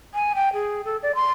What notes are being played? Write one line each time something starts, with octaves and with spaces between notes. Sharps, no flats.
G#5
G5
G#4
A4
D5
C6